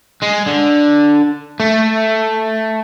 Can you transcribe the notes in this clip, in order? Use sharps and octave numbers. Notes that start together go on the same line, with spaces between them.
G#3
D3
A3